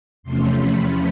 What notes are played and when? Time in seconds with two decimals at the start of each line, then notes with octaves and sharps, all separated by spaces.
0.23 E2 C3 F3 A3 C#4 C6
0.58 B5